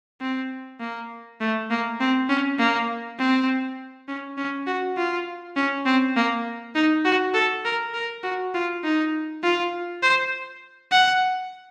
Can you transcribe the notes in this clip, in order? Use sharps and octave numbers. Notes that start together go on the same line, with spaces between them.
C4
A#3
A3
A#3
C4
C#4
A#3
C4
C#4
C#4
F#4
F4
C#4
C4
A#3
D#4
F#4
A4
A#4
A#4
F#4
F4
D#4
F4
C5
F#5